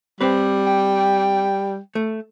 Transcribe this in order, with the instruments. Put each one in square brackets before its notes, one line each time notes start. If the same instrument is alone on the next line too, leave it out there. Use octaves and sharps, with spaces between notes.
[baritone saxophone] G3 [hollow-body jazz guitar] C4 B4
[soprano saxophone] G5
[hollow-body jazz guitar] A3